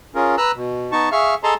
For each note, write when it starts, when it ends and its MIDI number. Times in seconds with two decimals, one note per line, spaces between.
0.15 0.36 61
0.15 0.36 65
0.15 0.36 68
0.15 0.36 70
0.38 0.51 71
0.38 0.51 82
0.38 0.51 88
0.38 0.51 90
0.55 0.91 47
0.92 1.09 59
0.92 1.09 63
0.92 1.09 81
0.92 1.09 85
1.12 1.35 68
1.12 1.35 76
1.12 1.35 77
1.12 1.35 85
1.12 1.35 89
1.44 1.54 68
1.44 1.54 69
1.44 1.54 75
1.44 1.54 81
1.44 1.54 82
1.44 1.54 84